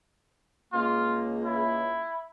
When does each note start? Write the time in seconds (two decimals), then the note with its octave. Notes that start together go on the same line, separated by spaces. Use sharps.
0.73 C#2 A#3 F4
1.45 E4